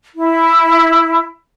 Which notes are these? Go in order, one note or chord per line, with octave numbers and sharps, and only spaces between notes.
E4